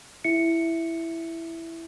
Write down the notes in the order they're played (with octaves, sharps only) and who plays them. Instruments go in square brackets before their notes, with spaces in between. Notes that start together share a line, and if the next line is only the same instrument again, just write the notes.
[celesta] E4 E5 C#7